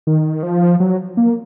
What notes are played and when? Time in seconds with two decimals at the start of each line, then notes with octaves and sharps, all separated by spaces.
0.07 D#3
0.43 F3
0.80 F#3
1.17 A#3